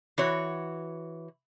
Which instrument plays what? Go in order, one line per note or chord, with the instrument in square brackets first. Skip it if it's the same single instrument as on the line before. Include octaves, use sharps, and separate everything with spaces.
[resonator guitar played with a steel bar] E3 F#4 C#5